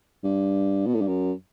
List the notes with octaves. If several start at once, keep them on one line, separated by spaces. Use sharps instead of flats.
G2
B2
A2
G2
F#2